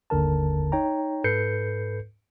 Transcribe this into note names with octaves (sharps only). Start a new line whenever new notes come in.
G1 D#2 D3 A#4 A5
D#4 C#5 G5 A#5
G#2 A4 B4 G6 C7 C#7